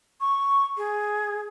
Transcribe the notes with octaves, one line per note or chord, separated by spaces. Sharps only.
C#6
G#4